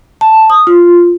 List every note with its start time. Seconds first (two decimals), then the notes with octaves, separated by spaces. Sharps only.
0.21 A5
0.50 D#6
0.67 F4